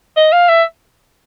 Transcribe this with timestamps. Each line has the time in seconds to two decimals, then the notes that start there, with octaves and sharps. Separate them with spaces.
0.17 D#5
0.32 F5
0.48 E5